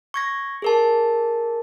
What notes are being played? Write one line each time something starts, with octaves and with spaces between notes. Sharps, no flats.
C#6 G#6 A#6
G#4 A#4 A5